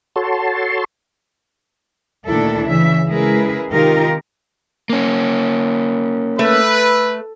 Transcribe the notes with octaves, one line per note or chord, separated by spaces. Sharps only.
F#4 A4 C#5 A5 C6
D2 A#2 D#3 D4 E4 A4
C#3 E3 E5
C#3 G#3 E4 G#4 A#4 B4
C3 D#3 D#4 F4 G4 A#4
A#3 C#4
A3 B4